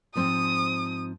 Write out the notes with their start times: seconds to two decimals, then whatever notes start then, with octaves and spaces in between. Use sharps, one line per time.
0.16 G#2 F3 C4 D#6